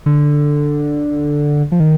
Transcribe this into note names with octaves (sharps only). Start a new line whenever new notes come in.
D3
F3
D#3